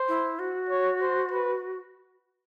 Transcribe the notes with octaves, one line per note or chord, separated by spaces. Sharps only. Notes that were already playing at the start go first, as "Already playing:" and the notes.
Already playing: C5
E4
F#4
C#5
C5
B4